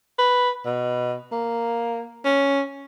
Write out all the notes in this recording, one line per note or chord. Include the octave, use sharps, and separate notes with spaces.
B4
B2
A#3
C#4